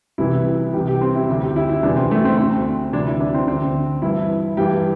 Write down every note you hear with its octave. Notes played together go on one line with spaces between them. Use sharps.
C2 C3 E3 E4
C2 C3 E3 G4
G4
C4
E4
D2 D3 G4
G4
E4
E4
E2 C3 E3 D4
C4
A3
C4
D2 D3 C4
D2 C3 E3 D4
E4
D4
C4
D2 D3 C4
G2 E3 E4
G2 E3 G4